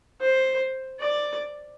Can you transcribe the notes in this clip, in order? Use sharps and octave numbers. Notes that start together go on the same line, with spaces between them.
C5
D5